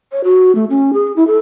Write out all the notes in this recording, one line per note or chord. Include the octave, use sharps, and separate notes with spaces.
C#5
F#4
A3
C#4
G#4
E4
A4